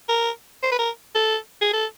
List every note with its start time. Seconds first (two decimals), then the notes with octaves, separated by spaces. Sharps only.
0.09 A#4
0.63 C5
0.72 B4
0.79 A#4
1.15 A4
1.62 G#4
1.73 A4